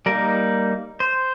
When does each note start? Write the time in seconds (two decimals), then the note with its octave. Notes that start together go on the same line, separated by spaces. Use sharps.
0.06 G3 A#3 D#4 A#4
1.00 C5